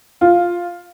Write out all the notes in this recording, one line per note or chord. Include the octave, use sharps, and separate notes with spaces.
F4